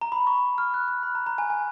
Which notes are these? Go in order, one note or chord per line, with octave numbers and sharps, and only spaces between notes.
A#5
B5
C#6
F6
F#6
F#6
B5
A#5
A#5
G#5
G#5